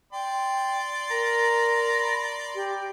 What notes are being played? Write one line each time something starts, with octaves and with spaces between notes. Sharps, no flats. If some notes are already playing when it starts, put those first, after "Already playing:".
D5 G5 C6
A#4 A#5
B5
G4